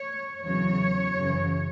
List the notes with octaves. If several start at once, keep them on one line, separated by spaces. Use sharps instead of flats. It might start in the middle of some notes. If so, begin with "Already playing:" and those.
Already playing: C#5
E2 C#3 F#3 C#5
F#2 C#3 E3